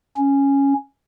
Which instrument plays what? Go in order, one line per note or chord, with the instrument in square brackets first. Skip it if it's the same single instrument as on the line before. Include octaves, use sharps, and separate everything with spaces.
[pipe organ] C#4